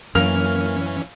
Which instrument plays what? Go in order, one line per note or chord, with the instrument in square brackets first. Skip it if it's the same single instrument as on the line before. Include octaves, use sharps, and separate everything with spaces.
[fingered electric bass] F#2 [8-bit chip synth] E3 C#4 [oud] A#3 [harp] F6